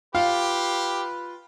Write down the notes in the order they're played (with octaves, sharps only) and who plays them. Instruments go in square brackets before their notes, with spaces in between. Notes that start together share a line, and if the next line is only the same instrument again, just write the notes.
[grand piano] F4 [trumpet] G4 [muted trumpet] B4 [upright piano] F5